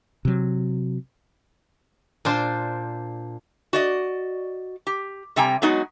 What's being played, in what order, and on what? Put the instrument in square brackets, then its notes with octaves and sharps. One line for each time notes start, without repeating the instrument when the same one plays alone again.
[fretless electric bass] C3 F#3
[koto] A#2 D4 C5
[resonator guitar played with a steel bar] F#4 D5 D#5
G4
C3 G3 C4 G5 G#5 A#5
F#3 G#3 B3 D#4 F#4